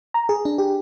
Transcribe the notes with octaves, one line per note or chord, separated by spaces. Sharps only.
A#5
G#4
D4
G4